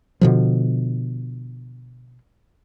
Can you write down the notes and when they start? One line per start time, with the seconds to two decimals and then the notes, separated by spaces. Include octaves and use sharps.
0.21 B2 D3 F3